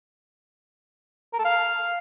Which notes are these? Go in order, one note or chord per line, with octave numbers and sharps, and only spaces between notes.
A#4
A4
F5